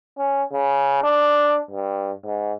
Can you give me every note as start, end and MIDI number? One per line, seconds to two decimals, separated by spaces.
0.18 0.43 61
0.52 1.00 49
1.03 1.59 62
1.71 2.12 43
2.25 2.53 44